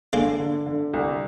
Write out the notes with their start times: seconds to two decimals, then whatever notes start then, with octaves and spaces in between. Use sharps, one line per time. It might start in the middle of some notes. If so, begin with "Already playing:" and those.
0.13 D3 G#3 A#3
0.40 D3
0.66 D3
0.94 C2